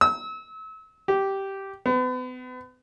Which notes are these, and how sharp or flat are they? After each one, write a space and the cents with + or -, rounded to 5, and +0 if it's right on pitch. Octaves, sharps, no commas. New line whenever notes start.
E6 -35
G4 -10
B3 +40